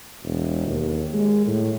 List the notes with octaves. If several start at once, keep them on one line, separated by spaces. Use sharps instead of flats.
E1
D#2
G#3
A2